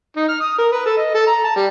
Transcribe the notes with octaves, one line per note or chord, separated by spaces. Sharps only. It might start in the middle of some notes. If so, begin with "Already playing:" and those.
D#4
F6
D#6
A#4
B4
A4
D#5
A4
A#5
A5
G3